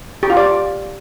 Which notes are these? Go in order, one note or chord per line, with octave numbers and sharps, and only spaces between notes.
G4
F4
D5